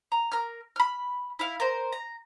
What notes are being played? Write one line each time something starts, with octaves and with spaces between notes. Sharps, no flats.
A#5
A#4 F6
B5 F6
E4 F5
A#4 C5
A#5